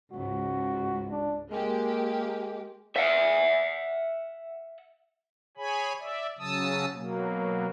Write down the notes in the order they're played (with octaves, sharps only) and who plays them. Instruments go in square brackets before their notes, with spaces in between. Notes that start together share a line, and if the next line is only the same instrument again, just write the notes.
[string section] C#2 G#2 [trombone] F#4
[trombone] D4
[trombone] G#3 [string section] A#3 G4
[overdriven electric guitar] E5 F#5
[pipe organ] G#4 C#5 G#5 B5
D5 E5
C#3 F#3 A5 D#6 E6
B2 F#3 A#3